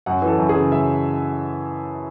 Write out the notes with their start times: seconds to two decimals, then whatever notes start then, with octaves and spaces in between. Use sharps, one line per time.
0.06 F#2 F#5
0.22 E3
0.27 A4
0.38 F#2
0.49 G#4
0.56 C#3
0.72 F#2 E5